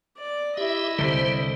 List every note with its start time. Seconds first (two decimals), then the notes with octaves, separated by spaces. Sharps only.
0.18 D5
0.57 E4 G4 D#5 E5
0.98 C2 D3 G3 C5